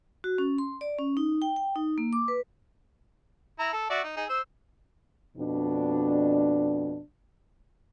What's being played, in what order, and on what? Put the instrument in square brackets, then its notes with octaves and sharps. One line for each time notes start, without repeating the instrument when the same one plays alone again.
[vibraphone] F#4
C#4
C6
D5
C#4
D#4
G5
G5
D#4
A#3
D6
B4
[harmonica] E4 A#5
A4
F#4 D5 E5
D#4
D#4 G#4
C5 E6
[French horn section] F2 B2 D4